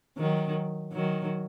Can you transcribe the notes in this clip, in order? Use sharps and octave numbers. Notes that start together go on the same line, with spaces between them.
D#3 F#3
D#3 F#3